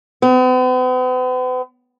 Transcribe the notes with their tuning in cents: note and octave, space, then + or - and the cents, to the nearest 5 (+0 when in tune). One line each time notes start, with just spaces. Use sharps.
B3 +45